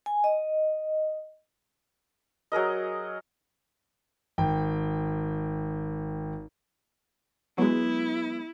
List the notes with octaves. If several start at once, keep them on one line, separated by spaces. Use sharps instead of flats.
G#5
D#5
F#3 G#4 A#4 D#5
G#1 G5
F#3 G#3 B3 E4